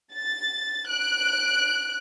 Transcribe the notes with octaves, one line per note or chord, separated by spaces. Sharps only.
A6
F#6 D7